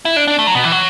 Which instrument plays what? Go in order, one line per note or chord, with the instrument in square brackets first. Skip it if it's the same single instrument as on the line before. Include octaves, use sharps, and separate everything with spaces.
[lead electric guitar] E4
D4
D4
A3
F#3
B2
E3
F#3